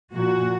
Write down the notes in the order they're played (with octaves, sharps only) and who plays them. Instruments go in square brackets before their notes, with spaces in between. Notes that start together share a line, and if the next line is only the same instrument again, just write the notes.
[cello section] A#2 F3 F#4